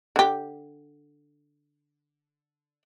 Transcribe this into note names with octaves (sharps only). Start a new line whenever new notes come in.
D3 G4